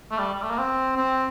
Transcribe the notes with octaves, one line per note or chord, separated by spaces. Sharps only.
A3
G3
G3
A3
A#3
C4
C4